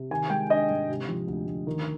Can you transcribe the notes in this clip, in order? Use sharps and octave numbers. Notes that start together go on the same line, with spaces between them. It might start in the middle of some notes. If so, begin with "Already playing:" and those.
Already playing: C3
D#3 G#5
G#3 G5
D4 D#5
G#2
C3
F3
D2
D2
D#3